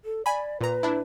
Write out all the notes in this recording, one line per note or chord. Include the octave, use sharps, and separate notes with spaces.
A4
D5 G#5 B5
A#2 B4 A#5
D4 E4